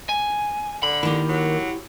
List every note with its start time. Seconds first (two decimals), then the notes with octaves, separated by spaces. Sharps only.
0.09 G#5
0.83 D3 B5
1.03 D#3 A#3 E4 G4
1.29 F#3